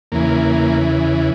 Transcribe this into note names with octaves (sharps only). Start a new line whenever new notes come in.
E2 C#3 E3 A#3